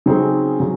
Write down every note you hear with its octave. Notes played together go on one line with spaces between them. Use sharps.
C#3 F#3 C4 D#4 G#4
C#3 F#3